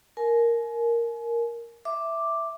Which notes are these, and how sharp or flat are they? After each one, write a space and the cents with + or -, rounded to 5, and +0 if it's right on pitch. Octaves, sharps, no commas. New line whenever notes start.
A#4 +0 G#5 +40
E5 +0 D6 +0